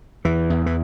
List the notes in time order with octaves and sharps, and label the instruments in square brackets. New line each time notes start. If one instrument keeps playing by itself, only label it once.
[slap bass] E2 E3
E2
E3